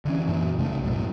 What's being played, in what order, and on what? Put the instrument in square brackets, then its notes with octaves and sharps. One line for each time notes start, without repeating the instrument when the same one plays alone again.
[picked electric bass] D3 E3 C#4
F#2 A#2 E3
C2 C#3 A3
B1 F#2 A2